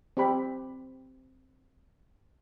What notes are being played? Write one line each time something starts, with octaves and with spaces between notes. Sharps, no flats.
C4 G4 B5